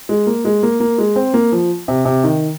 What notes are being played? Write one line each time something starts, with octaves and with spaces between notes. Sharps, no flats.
G#3
A#3
G#3
A#3
A#3
G#3
C4
A#3
F3
C3
C3
D#3